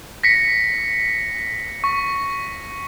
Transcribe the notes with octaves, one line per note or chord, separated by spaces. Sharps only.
A#6 B6 C#7
C#6